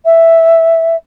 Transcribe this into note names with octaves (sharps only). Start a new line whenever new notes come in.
E5